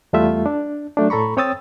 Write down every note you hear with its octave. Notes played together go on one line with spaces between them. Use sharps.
E2 G3 A3 F4 E5
D4
F#3 A3 D4
A2 A4 A#5 B5 C#6
C4 C#5 G5 D#6 E6 A6